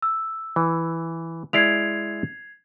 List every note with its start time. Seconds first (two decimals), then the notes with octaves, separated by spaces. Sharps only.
0.02 E6
0.56 E3
1.53 G#3 E4 D5 G#6 C7 F7